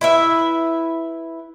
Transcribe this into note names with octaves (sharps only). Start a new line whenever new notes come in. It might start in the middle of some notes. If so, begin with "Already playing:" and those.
E4 B4 E5